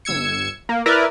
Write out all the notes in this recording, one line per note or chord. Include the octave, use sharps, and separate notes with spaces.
G1 E6 G#6 C#7
A#3
E4 A#4 B4 D5 E5